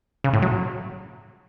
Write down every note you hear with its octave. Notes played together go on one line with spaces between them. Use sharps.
C#3
A2
F#3